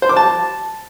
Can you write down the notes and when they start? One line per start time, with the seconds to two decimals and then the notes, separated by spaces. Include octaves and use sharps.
0.02 C5
0.09 D6
0.17 A5